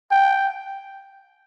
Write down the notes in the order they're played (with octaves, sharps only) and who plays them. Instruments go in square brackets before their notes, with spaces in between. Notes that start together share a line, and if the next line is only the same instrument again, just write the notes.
[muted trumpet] G5